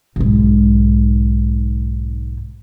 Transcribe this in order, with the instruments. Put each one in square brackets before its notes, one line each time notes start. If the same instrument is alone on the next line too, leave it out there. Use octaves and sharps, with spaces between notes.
[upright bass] B1 G#2